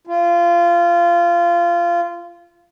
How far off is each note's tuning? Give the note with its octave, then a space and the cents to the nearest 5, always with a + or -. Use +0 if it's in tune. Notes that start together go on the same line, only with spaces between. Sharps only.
F4 -20